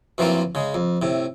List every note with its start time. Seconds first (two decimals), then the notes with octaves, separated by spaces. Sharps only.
0.18 F#2 E3 F3 A#3 C4 F4
0.55 C#3 G#3
0.74 F2
1.02 A2 C3